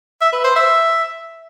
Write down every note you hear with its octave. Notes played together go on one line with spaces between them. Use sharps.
E5
B4
C5
E5